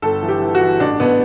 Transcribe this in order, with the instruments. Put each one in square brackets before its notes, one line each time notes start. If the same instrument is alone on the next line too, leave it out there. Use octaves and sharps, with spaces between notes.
[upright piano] G1 A4
E3
G4
E3
F#4
E3
A1 D4
A1 B3